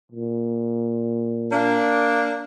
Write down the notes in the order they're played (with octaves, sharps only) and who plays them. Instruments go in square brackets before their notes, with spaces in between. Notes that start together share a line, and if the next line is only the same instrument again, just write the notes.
[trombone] A#2
[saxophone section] A#3 D4